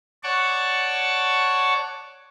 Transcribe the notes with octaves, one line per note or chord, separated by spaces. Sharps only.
C#5 D5 F#5 A5 C#6 D6